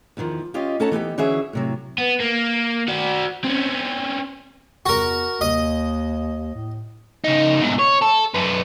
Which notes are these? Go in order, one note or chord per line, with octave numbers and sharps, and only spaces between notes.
E2 D3 D#3 F3
C#4 F4 G4 D#5
C#4 D#4 A4 C#5 F#5 A5
E3 B3 D#4 G4
D3 E3 C#4 F#4 G#4 E5
A2 C3 F#3
B3
A#3
F#4 D5
C4 C#4
E2 F#4 A#4
D#2 D#5
A2
C#3 D#4
E2 G#2
C#5
A4
F#2 B3